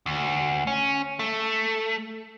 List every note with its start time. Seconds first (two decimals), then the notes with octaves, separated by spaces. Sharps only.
0.06 D2
0.67 C#4
1.19 A3